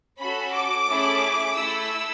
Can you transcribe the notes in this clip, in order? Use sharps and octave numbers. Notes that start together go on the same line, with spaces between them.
C#4 F#4 A4 B5
D6
A3 C#4 E4 G#4
A3 E4 A4 E6